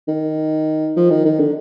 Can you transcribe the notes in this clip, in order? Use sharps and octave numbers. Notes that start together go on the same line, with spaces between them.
D#3
F3
D#3
D#3
D3